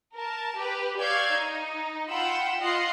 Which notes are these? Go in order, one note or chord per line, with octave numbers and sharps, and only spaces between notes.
A#4 A5
G4 B4
D5 F5 C#6 E6 G6 G#6
D#4
F4 F#5 G5 B5 E6
F4 D#5 F#5 C7